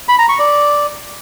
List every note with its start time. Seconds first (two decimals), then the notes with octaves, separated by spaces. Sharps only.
0.08 B5
0.19 A#5
0.29 C#6
0.39 D5